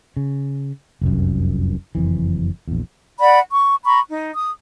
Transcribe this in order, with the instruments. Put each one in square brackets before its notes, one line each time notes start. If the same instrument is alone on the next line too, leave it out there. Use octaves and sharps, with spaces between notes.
[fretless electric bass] C#3
F1 C2 F#2
F#1 F2 E3
A#1 E2
[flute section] D5 F#5 B5
C#6
A#5 B5 C#6
D#4
D#6